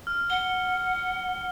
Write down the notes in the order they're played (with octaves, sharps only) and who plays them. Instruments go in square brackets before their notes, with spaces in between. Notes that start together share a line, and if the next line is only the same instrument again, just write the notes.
[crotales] F6
[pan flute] F#5 [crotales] G7